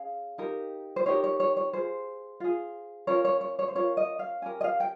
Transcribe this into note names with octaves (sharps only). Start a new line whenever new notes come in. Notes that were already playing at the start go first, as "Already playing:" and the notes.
Already playing: C#4 G#4 F5
D#4 G4 A#4
C5
D#4 G4 A#4 C#5
C#5
C#5
C#5
F4 G#4 C5
F4 G#4
C#4 F4 A#4 C#5
C#5
C#5
C#5
C5
C#4 F4 A#4 C#5
D#5
F5
C#4 G4 A#4 G#5
D#5
F5
G5